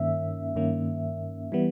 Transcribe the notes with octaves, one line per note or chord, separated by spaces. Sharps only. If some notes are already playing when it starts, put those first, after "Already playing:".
Already playing: G2 D#3 A#3 C#4 E5
G2 D#3 A#3 C#4
E3 G3 B3